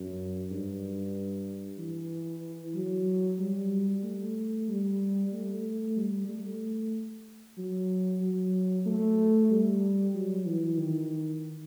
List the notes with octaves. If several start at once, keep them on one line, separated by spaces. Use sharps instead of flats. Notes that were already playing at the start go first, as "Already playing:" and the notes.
Already playing: F#2
G2
E3
F#3
G3
A3
G3
A3
G3
A3
F#3
F#3
A3
G3
F#3
E3
D#3